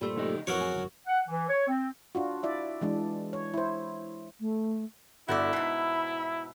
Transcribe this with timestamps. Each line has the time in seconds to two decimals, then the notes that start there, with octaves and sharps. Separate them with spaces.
0.01 G2 A#2 G3 A3 C5
0.16 C#3 D#4 D#5
0.47 F2 E3 F#3 F#4 A#4 C#5
0.61 G#4
0.74 G1 C#2 F#2
1.07 F#5
1.27 E3
1.48 C#5
1.67 C4
2.15 D4 F4 F#4
2.43 E4 D5 E5
2.81 E3 G#3 D4
3.33 C#5
3.54 E4 C5
4.40 A3
5.28 G1 E4 F#4 A4 D5 E5
5.53 G#2 B2 B5